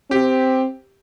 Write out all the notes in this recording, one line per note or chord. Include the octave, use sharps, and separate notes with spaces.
C4 G4